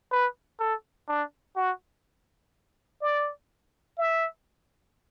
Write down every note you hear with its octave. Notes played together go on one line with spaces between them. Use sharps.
B4
A4
D4
F#4
D5
E5